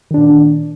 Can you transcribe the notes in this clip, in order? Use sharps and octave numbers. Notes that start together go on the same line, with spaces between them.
A#2 D#3 D4